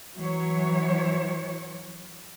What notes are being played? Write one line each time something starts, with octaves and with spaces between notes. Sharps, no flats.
E3 F#3 C#5